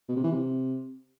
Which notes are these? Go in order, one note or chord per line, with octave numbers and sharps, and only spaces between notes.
B2
C3
E3
C3